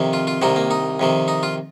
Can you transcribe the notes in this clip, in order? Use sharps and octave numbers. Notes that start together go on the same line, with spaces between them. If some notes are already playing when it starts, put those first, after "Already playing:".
Already playing: F2 C3 D#3
F4
F4
C2 C3 D#3 D#4
A#3
D#4
F2 C3 D#3
D#4
F4